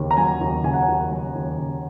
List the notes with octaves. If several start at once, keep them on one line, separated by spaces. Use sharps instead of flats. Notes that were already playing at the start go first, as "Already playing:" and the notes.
Already playing: D#2 C#3
A#5
F#3 G#5
D#2
C#3 G#5
F#5
G#5
D#2
F#3
D#2
C#3